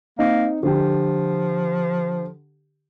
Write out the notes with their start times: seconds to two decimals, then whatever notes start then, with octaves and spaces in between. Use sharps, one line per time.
0.19 A#3 C4 D#4
0.63 D3 F3 G4